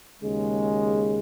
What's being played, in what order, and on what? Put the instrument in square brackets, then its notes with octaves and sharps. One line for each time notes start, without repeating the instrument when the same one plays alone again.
[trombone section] D#2 C#3 G#3